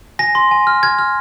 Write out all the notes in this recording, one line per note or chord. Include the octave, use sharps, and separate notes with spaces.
G#5 A#6
C6
G#5
F6
F6 G#6
F6